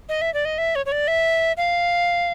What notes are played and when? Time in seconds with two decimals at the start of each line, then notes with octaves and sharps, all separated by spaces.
0.09 D#5
0.22 E5
0.34 D5
0.45 D#5
0.58 E5
0.75 C#5
0.86 C#5
0.92 D5
1.08 E5
1.57 F5